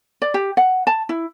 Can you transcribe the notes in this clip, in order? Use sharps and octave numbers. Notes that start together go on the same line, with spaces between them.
D5
G4
F#5
A5
E4